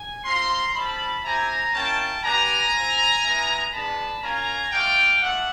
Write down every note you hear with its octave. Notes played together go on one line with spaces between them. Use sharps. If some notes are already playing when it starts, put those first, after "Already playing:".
Already playing: G#5
C4 F4 A#5 C6
G3 C4 D#4 A5 B5
C4 E4 G4 G#5 A#5
A#3 C#4 E4 G5 A5
B3 D4 G4 G#5 A#5
C4 F4
G#3 B3 E4
G#3 B3 D4 A5 B5
A#3 C#4 F4 G#5 A#5
A3 D4 F4 F5 G5
A3 D4 F4 E5 F#5